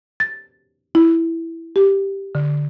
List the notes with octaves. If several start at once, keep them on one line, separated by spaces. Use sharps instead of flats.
A6
E4
G4
D3